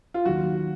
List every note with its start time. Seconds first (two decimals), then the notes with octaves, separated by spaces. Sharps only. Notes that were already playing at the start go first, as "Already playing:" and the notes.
0.14 F4
0.25 D#2 D#3 F#3 F#4